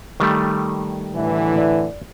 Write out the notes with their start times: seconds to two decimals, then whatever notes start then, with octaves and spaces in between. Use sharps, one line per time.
0.20 D#3 G3 A3
1.14 A2 D3 E3
1.58 D5